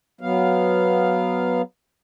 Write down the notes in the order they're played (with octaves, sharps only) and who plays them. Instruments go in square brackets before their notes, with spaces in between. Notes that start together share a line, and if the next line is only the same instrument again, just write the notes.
[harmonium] F#3 B3 F5